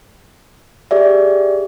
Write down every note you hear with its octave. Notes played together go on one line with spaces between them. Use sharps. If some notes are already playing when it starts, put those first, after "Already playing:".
G4 G#4 D5 E5